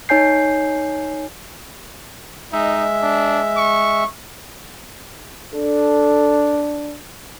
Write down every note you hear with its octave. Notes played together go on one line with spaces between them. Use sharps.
D#4 C#5 G#5 G6 C7
G#3 D#4 E5
D4
C#6
D4 A4